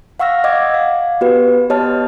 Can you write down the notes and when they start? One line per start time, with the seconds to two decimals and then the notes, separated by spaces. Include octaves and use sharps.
0.19 F5 F#5 C#6 E6 F6 A#6
0.44 D#5 F#5 D6 G#6
0.74 F5
1.21 B3 F#4 G4 B4
1.70 B3 G4 C#5 D#5 A5 F6